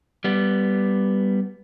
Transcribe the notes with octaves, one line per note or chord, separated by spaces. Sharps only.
G3 B3